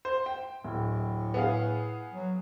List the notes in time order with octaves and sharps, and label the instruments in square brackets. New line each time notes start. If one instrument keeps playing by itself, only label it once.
[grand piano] C5
G5
[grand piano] D1 [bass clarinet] A2
[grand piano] B3 G#4 F5
[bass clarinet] F#3